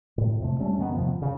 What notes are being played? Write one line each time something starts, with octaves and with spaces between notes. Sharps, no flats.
A2
F2 C3 A3
G3 A3 C#4
F#2 D#3 A#3 B3
F2 C3 D#3 F3
C#3